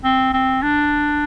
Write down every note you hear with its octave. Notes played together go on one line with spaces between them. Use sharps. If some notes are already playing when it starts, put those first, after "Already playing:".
C4
C4
D4